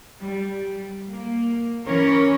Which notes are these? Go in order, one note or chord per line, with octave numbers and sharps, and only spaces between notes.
G3
A#3
E3 C#4 A#4 C#5